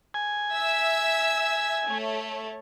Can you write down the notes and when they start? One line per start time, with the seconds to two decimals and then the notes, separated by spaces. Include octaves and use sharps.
0.14 G#5
0.54 E5 E6
1.87 A3 C#5